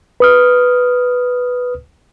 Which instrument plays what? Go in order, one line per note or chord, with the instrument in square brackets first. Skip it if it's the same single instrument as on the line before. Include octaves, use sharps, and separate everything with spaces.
[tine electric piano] B4 D#6 F6